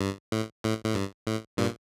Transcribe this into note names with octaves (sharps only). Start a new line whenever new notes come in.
G2
A2
A2
A2
G2
A2
G2 A#2